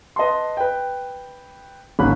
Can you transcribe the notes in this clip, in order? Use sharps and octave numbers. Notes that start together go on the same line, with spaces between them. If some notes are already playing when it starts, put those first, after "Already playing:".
B4 D#5 A5 C6
B4 G5
D1 G#1 A#3 C#4 B5 F#6